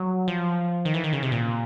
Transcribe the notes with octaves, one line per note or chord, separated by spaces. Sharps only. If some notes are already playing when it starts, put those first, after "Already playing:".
Already playing: F#3
F3
D#3
E3
D#3
C#3
C3
A#2